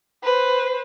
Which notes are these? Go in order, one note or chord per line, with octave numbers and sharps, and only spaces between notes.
B4 C5